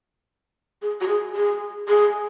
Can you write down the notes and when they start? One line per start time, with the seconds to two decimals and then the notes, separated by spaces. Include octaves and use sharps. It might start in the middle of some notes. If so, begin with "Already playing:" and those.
0.82 G#4
1.01 F#4
1.08 G#4
1.35 G#4
1.89 G#4